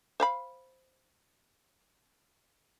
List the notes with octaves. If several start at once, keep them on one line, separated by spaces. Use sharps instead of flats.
C5 F5 B5